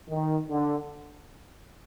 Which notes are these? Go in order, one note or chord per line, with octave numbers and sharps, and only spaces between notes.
D#3
D3